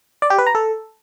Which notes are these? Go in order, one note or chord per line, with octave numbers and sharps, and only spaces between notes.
D5
G4
B4
A#5
A4